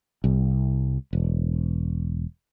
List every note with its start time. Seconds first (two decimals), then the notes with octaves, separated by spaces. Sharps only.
0.24 C2
1.13 E1